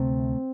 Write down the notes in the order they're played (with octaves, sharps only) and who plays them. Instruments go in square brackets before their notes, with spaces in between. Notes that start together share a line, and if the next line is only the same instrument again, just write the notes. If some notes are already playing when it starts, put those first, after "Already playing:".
Already playing: [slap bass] D2 C3 A3 [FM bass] C4